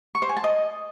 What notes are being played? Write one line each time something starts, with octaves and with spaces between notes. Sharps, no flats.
C#6
C5
G#5
A5
D#5